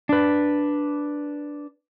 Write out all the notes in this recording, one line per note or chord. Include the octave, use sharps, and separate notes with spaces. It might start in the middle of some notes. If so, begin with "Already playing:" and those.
D4 B4